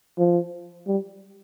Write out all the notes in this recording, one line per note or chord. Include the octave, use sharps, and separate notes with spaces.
F3
G3